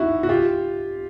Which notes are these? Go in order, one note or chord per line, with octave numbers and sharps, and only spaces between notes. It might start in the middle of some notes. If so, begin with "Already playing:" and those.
Already playing: D#4 E4 F#4
F#4
F4 G4